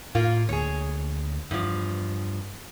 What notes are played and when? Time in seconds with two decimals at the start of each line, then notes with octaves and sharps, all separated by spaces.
0.15 A2 A#3 F4
0.49 D2 D3 A#3 G#4 C#5
1.51 E2 G2 F3